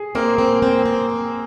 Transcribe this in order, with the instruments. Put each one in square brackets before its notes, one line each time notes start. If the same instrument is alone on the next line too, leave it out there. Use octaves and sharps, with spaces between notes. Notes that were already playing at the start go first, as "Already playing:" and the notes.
Already playing: [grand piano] G#4
[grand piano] A#3 [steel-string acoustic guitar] C4
[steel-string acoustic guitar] C4
C4
C4
C4